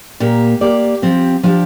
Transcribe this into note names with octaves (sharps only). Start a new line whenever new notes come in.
A#2 A#3 G4
A#3 G4 D5
F3 C4 G4
F3 D4 G4